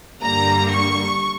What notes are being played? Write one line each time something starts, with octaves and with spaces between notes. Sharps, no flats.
G2 D3 G3 A#3 A#5
C#6